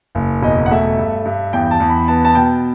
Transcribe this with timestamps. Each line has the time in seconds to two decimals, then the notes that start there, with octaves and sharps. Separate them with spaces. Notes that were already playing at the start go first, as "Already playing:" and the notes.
0.15 F#1
0.42 E1 D#5
0.66 F#5
0.71 A3 E5
0.97 G2
1.25 G2
1.53 E2 G5
1.71 A5
1.80 E2
1.90 B5
2.08 B3 A5
2.25 A5
2.35 B2 G5